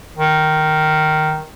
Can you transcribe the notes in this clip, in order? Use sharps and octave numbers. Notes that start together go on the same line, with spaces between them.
D#3